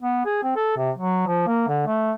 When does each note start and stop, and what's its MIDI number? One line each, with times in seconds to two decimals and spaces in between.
0.02 0.24 59
0.26 0.43 68
0.43 0.52 60
0.56 0.74 69
0.77 0.91 48
0.97 1.23 54
1.27 1.43 53
1.47 1.67 58
1.68 1.85 50
1.87 2.12 57